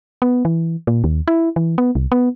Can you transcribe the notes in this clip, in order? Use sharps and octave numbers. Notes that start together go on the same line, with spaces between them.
B3
E3
A#2
D#2
E4
E3
B3
C2
B3